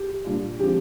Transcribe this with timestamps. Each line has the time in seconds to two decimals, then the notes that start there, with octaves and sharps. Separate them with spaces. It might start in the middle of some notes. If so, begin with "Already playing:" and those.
Already playing: G4
0.25 A#2 G3 D4 F4
0.59 D3 F3 G#3 C4 G4